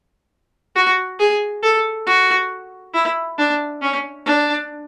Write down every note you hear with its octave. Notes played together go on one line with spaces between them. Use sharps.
F#4
G#4
A4
F#4
E4
D4
C#4
D4